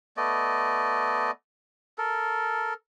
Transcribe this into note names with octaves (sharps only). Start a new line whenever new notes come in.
A3 B3 D5 D#5
A4 A#4